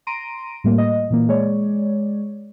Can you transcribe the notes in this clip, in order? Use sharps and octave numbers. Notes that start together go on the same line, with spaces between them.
A#5 C6 A#6 D7 D#7
A2 G3 A3 A#3
D#5
A#2 E3 A#3
G#3 C#5 D5